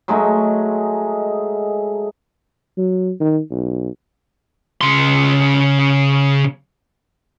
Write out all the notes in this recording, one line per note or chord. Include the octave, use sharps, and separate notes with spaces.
F#3 G#3 A3 D#4
F#3
D#3
B1
C#3 C6